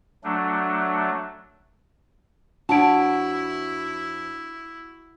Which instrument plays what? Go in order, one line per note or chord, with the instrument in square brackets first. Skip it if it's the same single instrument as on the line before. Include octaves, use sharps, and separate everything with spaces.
[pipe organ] F#3 A3 D4
[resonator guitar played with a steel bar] F2 C#5 A5 [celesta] D4 D7 [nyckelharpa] E4 [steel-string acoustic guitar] F#4